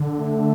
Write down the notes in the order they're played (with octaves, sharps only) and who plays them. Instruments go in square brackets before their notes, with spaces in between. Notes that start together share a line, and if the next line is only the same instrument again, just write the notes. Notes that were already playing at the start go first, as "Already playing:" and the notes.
Already playing: [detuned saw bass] D3
[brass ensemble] A3